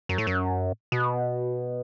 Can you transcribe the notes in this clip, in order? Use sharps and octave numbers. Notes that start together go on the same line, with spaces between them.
F#2
A2
F#2
B2